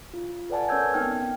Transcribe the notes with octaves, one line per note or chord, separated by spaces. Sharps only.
F4
A4 B4 D5 F#5 G#5 A5
C#4 A#4 C#5 E6 G6 G#6
B3 C4 D#4 G5 F6